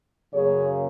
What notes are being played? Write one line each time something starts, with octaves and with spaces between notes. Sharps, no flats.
F#2 C#3 F#3 A#3 G#4 C#5